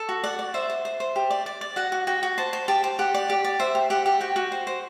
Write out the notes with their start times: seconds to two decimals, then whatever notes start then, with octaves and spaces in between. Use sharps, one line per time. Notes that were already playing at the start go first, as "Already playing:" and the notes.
Already playing: A4
0.09 F#4
0.24 D5 F#5
0.39 D5
0.54 C5 E5
0.70 C5
0.85 C5
1.00 C5
1.16 G4
1.30 D5
1.46 D5
1.61 D5
1.76 F#4 F#5
1.92 F#4
2.07 F#4 G5
2.23 F#4
2.38 C5 A5
2.53 C5
2.68 G4 A5
2.84 C5
2.99 G4 F#5
3.14 D5
3.29 G4
3.44 D5
3.60 C5 E5
3.75 G4
3.90 G4 F#5
4.06 G4
4.21 F#4 G5
4.36 F#4
4.52 C5
4.67 C5